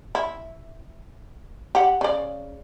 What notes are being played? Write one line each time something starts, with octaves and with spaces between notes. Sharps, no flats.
E4
G4 F#5
C#3 D5